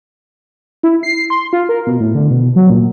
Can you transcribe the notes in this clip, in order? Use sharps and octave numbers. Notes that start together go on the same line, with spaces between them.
E4
C7
C6
F4
A#4
B2
A2
D3
B2
F#3
A#2